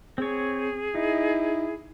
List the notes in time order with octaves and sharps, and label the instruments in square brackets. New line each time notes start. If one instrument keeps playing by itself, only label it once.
[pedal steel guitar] C4 C#5 [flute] G#4
[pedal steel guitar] D#4 [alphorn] E4